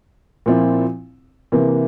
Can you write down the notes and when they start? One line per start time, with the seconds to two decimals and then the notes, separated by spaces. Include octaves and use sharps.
0.46 A#2 F3 C4 E4
1.52 C3 E3 A#3